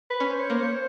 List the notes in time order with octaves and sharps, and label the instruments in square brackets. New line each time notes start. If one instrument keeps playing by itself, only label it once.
[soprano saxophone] B4
[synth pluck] C#4
[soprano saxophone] C5
C#5
[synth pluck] A#3 [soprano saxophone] C5
[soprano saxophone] C#5
C5